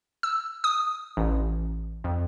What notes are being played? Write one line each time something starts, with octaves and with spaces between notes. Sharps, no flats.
E6
D#6
A1
F2